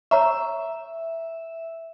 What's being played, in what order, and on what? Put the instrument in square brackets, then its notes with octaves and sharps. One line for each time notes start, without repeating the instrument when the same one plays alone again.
[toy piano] C#5 A#5 C#6 [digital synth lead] E5